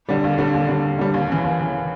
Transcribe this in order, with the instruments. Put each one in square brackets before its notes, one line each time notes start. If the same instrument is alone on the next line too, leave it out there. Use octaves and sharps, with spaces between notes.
[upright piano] D3 G3
D#2
D3 G3
D#2
D3 G3
D#2
D3 G3
D#2
C#3 E3
D#2
C#3 E3